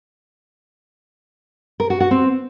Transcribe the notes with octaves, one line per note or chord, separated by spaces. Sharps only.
A#4
F#4
F#4
C4